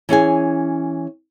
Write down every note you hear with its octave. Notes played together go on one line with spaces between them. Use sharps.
E3 C#4 G#4 G#5